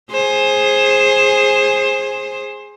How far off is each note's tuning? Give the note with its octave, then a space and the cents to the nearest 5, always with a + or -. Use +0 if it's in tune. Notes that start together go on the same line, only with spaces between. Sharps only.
G#4 +0 C5 +20